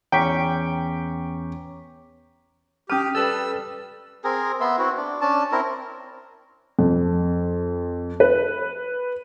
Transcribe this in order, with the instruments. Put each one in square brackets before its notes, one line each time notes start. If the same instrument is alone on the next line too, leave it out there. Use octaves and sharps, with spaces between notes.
[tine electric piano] E2 C#4 C#6 [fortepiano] G5 [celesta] A#5 D6 B6
[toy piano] C#4 A5 [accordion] G4 [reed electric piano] G5 D#6 F6
[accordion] G3 E6 [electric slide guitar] A4 B4
[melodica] C4 G#4 A#4
B3 E5 C6
C4 E4 F#4
D4
C#4 D4 A5
C4 E4 A#4
[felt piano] F2
B4